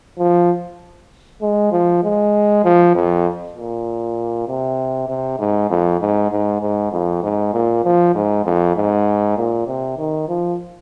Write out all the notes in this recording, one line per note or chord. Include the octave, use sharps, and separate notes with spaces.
F3
G#3
F3
G#3
F3
F2
A#2
C3
C3
G#2
F2
G#2
G#2
G#2
F2
G#2
A#2
F3
G#2
F2
G#2
A#2
C3
D#3
F3